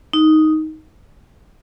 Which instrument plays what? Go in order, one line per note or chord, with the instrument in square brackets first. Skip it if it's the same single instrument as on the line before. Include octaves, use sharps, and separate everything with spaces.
[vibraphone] D#4